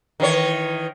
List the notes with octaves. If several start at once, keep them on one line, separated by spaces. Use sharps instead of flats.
D#3 E3 C#5